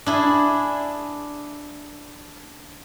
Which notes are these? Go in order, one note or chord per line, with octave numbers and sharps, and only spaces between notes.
D4 E4 G#4